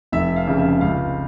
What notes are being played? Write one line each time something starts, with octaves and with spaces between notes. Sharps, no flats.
F1 E5
F5
F2 C#3
E5
C#2 F5